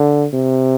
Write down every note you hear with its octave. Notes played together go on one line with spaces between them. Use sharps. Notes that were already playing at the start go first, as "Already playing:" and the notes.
Already playing: D3
C3